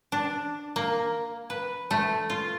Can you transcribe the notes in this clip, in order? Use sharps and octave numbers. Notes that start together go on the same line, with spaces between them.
D4
A#3
B4
A3
F4